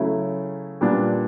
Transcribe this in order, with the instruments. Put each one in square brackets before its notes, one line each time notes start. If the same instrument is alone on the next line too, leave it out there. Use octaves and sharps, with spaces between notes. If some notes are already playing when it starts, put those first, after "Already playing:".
Already playing: [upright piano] C#3 F#3 A3 C#4 E4
A#2 G3 B3 D4